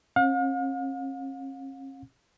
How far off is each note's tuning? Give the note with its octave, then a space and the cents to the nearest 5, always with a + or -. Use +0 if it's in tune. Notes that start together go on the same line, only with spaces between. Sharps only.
C#4 -45 F5 +45